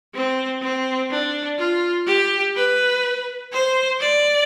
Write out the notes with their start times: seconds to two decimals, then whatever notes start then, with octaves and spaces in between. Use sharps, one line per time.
0.15 C4
0.62 C4
1.11 D4
1.58 F4
2.06 G4
2.55 B4
3.52 C5
4.00 D5